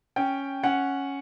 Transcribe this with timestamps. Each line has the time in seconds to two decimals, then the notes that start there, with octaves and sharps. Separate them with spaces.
0.16 C#4 G5
0.63 C#4 F#5